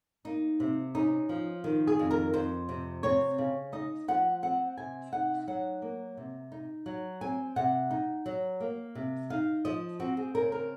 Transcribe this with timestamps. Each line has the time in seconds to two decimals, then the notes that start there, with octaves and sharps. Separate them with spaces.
0.25 A#3 D#4
0.60 C3
0.94 C#4 D#4
1.29 F3
1.64 D#3
1.87 G#4
1.99 F2
2.11 A#4
2.33 F2 C5
2.69 C3
3.03 C4 C#5
3.38 C#3
3.72 D#4 D#5
4.08 F3 F#5
4.42 C4 F#5
4.77 C3 G#5
5.12 D#4 F#5
5.48 F#3 F#5
5.82 A#3
6.17 C3
6.52 D#4
6.86 F#3
7.21 C4 G#5
7.56 C3 F#5
7.91 D#4
8.26 F#3
8.60 A#3
8.95 C3
9.30 D#4 F5
9.65 F3 D#5
10.00 C4 F#4
10.17 G#4
10.35 C#3 A#4
10.52 A#4